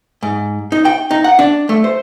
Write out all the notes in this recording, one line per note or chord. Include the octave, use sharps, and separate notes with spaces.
G#2
D#4
G5
D#4
F#5
D4
A3
C5